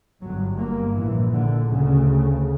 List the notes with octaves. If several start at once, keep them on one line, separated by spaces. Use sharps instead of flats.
G1 G2 F#3
A#3
A#1 A#2 E3
D3
D2 C#3